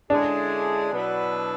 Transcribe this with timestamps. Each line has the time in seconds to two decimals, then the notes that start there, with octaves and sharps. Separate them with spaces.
0.10 D3 G#3 C#4 D4 E4 G#4
0.91 B2 F#3 B3 E4 B4